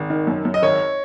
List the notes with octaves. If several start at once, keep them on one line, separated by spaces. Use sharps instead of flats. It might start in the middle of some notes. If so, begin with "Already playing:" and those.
Already playing: G#1
D#3
F#2
F#2
D#5
G#1 C#5